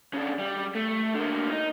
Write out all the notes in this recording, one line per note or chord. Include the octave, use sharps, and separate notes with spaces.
C#3 D4
G3
A3
D3 A#3
D#4